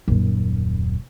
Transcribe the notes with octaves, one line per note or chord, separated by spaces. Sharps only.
D#1 F#2